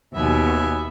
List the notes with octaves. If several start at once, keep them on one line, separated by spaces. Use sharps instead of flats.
D#2 B2 B3 E5 G#5